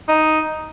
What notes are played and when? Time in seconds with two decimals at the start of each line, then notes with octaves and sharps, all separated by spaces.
0.08 D#4